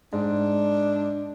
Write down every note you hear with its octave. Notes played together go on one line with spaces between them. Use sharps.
G#2 D4